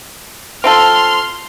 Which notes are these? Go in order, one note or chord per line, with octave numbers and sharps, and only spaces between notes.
C4 F4 A4 C6 F6